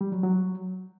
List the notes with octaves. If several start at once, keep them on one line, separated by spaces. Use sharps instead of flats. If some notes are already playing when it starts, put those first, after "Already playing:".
G3
F#3
F#3